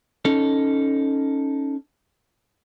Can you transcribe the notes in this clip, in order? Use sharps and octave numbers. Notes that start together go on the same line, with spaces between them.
C#4 D#4 A4 C#5